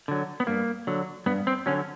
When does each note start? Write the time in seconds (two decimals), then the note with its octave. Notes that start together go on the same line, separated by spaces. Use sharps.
0.08 D3 F#3
0.40 B3
0.47 G2 A#3
0.87 D3 F#3
1.26 G2 B3
1.47 C4
1.66 D3 F#3 C#4